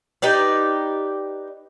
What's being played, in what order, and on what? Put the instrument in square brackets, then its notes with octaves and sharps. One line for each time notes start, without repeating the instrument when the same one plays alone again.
[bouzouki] D#4 G4 B4 D5